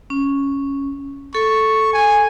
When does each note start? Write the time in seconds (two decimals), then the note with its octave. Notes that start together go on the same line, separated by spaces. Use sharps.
0.10 C#4
1.35 A4 C#6
1.94 G#5